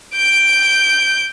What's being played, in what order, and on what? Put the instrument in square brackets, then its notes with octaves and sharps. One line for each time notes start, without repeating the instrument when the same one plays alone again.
[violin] G6 D7